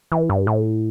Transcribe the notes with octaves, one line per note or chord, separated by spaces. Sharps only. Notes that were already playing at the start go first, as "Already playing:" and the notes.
E3
G2
A2